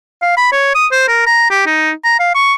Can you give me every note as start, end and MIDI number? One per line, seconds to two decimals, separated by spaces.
0.22 0.33 77
0.37 0.52 83
0.53 0.74 73
0.75 0.87 87
0.92 1.05 72
1.08 1.22 70
1.27 1.45 82
1.51 1.65 67
1.66 1.91 63
2.05 2.17 82
2.20 2.32 77
2.35 2.54 85